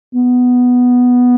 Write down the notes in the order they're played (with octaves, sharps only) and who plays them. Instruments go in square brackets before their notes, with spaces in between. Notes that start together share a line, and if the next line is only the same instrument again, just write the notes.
[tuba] B3